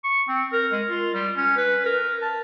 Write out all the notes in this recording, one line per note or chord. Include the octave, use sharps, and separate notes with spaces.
C#6
C4
A#4
G#3
F4
G3
C#4
B4
A#4
A5